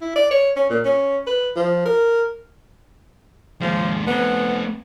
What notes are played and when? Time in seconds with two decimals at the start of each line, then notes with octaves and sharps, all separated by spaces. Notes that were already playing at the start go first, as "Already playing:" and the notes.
0.01 E4
0.16 D5
0.31 C#5
0.56 C#4
0.70 A#2
0.84 C#4
1.27 B4
1.56 F3
1.85 A#4
3.61 D#2 F3 G#3
4.07 A3 B3 C4